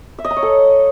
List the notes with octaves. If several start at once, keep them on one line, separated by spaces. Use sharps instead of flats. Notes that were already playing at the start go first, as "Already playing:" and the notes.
E5
D#5
A#5
C#5
A4